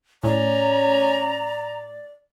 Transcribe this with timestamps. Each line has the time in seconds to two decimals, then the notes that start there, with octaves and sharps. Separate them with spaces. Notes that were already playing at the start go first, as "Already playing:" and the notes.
0.23 A2 C#4 D5 A#5